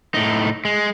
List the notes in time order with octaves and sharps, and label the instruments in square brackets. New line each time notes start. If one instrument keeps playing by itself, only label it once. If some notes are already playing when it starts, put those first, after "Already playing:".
[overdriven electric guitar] A2 D#4
G#3